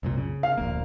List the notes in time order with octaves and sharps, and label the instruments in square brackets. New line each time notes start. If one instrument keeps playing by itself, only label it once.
[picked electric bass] C2 F#2 A#2
C#3
[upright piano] F5
[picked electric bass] D1 A#1 A#3